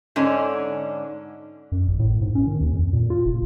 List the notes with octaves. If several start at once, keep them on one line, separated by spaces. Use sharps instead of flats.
G#2 D3 C#4 D4
F#2
G#1
A2
G#2
C#4
D#3
D#2
F2
A#2
F4
F#1